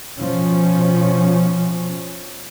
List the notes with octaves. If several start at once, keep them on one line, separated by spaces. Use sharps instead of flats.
B2 F3 C#4